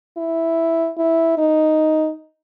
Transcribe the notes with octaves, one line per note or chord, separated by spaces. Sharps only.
E4
E4
D#4